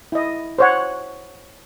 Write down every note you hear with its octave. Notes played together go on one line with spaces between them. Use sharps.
E4 D#5
C5 C#5 F#5